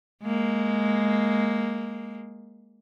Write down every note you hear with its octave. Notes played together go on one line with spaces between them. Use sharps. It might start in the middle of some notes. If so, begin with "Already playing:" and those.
G#3 A#3